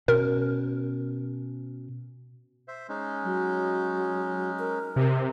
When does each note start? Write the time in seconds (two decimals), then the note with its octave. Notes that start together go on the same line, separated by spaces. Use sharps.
0.08 B2 C#4 A#4
2.68 C5 E5
2.89 G#3 C#4 D#4
3.24 F#3
4.59 A#4
4.96 C3 D#5